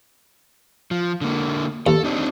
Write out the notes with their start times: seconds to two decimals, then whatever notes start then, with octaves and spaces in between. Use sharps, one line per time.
0.91 F3
1.21 D3 A#3
1.87 D#2 A4
2.04 C4 D4 D#4